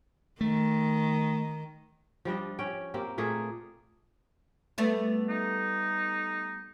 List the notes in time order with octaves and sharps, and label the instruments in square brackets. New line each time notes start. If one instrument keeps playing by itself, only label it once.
[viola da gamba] D#3 [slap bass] A3
[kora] F3 G3 D4 D#5
C#4 G5
A#3 C4 G4
A#2 A3 A#3 G#4
[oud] G3 A3 B3
[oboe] D#4